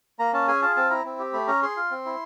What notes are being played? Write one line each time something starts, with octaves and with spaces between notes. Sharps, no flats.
A#3 A#5
C#4 A5
G#4 G#5
F4 A5
C4 A5
E4 A#5
C4
G4
A3 B5
C#4 A#5
G#4 C6
F4
C4
E4